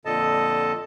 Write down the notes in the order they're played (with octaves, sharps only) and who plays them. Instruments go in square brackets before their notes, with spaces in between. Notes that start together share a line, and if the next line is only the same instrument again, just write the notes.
[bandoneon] F2 A#2 D3 A4 D#5 A5